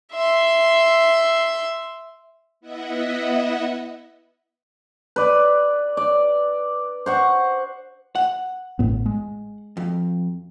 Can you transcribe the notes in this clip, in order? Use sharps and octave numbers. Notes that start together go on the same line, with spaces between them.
E5 C6
B3 E4 D#5 E5 F#5
B4 D5
D5
C5 F#5 C#6
F#5
A1 A2 B3
G#3
F2